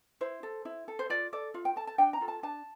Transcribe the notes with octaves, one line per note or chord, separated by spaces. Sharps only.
E4 C5
A4
E4
A4
C5
F4 D5
A4 D5
F4 F5
G5
A4 A5
A5
D4 G5
A#5
F4 A4
A5
D4 A5